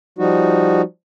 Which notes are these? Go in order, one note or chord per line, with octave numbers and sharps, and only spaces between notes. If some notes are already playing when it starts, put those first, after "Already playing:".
F3 G3 D#4 F#4